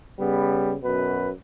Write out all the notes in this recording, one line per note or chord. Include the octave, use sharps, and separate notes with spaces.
C#3 G3 B3
F#2 B2 B4